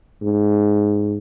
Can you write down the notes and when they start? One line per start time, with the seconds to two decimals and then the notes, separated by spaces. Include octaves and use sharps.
0.22 G#2